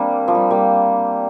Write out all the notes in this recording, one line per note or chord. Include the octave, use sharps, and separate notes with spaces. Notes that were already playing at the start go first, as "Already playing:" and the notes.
Already playing: G3 A#3 C4 D4
F3
G3
G3 A#3